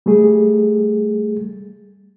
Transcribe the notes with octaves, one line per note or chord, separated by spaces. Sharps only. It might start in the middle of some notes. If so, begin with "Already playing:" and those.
G3 A3 G#4